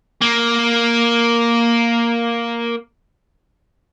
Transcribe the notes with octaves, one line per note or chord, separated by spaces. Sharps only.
A#3